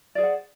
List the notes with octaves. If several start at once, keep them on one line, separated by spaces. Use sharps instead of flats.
G#4 C5 D5 F#5